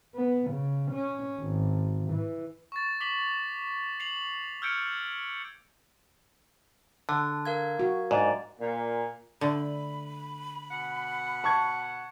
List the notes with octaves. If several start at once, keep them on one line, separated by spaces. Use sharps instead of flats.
B3
C#3
C#4
G#1
E3
C#6 A6
D6 B6 F#7 G7
C7 F7 F#7
E6 F6 G6 G#6 C#7 D7
D3 A5
A#4 F5 G#6
F#4
G#2 D5
A#2
D3 A3 B5
B2 F#5
A5 C#6 G#6